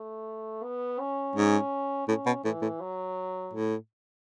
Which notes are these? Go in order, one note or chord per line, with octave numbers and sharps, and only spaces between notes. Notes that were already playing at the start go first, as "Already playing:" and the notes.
Already playing: A3
B3
C#4
G#2
A2 C#4
B2
A2 E3
A2
F#3
A2